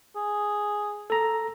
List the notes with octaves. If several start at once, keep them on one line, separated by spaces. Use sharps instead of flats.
G#4
A4 A#5